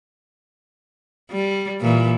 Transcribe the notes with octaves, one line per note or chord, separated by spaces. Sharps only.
G3
A#2 E3